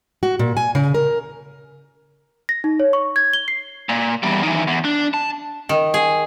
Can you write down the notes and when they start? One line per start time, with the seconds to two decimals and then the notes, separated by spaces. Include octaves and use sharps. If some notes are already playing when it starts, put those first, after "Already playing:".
0.23 F#4
0.39 A#2
0.57 G#5
0.75 C#3
0.94 A#4
2.49 A#6
2.64 D#4
2.80 C#5
2.93 C#6
3.16 G#6
3.33 G7
3.48 C7
3.89 A#2
4.23 E2 G3
4.43 D#3 E3
4.67 E2
4.85 D4
5.14 A5
5.69 D#3
5.94 G#4